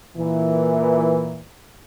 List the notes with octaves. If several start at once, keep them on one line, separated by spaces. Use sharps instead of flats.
A#2 E3